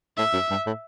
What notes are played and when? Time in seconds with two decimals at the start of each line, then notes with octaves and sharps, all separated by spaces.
0.17 A2 E5
0.33 F#2
0.51 G2
0.67 A2